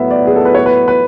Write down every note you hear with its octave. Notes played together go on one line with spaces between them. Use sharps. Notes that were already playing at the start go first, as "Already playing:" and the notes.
Already playing: A2 F#3 B3 E4 E5
D5
G#4
A4
B4
C#5
B4
B4